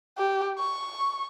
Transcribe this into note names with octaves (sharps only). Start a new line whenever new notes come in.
G4
C#6